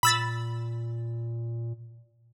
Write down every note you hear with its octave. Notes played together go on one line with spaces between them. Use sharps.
A#2 B5 E6 A6